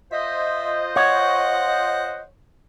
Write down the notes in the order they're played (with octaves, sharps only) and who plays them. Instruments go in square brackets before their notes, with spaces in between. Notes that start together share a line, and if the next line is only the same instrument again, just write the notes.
[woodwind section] F4 C5 D#5 [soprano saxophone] E5
[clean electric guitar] C#5 [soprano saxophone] F#5